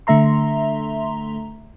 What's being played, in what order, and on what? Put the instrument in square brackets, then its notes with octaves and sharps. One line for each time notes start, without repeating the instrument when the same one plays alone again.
[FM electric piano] D3 A3 E5 A#5 C6